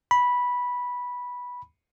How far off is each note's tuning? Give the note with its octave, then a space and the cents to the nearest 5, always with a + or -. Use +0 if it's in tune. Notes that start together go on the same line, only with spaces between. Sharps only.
B5 -10